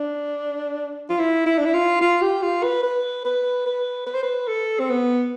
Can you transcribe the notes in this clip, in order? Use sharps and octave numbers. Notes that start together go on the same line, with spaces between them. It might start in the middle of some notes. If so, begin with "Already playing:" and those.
Already playing: D4
F4
E4
E4
D4
E4
F4
F4
G4
F4
B4
B4
B4
B4
B4
C5
B4
A4
C4
B3